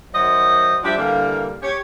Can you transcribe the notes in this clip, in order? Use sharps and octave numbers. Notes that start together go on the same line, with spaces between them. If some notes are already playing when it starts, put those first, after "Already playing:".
D#3 F#3 C5 D#5 E5 F#5
F3 G3 D4 G4 E5
D3 E3 G3 A#3
G4 C#5